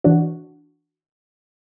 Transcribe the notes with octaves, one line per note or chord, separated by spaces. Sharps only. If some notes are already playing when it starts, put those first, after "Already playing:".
E3 D4 F#4